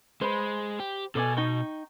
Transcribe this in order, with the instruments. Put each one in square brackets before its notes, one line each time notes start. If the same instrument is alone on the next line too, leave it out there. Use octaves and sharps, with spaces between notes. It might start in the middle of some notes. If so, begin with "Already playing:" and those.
[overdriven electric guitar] G#3 [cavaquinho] C5 B5
[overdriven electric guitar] G4
[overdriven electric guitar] B2 [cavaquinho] A4 D5 G#5
[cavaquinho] D#4 G5 C#6